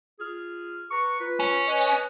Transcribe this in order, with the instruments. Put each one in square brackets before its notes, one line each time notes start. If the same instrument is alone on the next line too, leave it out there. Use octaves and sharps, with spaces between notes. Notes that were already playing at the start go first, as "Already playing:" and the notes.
[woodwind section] F4 G#4 F6
B4 A#5 C#6
F4 B4
[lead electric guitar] C#4
[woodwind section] B4 C#5 D#5